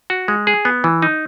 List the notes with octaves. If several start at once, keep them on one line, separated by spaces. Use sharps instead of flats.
F#4
G#3
G#4
B3
E3
D#4